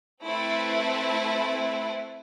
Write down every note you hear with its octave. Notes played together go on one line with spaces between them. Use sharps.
A3 C4 E4 B4